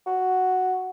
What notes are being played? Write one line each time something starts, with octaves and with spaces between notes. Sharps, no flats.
F#4